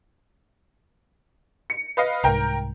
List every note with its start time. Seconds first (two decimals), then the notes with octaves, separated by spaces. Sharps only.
1.70 C#7
1.97 B4 D#5 F5
2.24 C2 G#2 A#4 G5 A#5